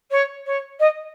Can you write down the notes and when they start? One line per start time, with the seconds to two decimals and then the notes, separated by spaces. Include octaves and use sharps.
0.11 C#5
0.46 C#5
0.79 D#5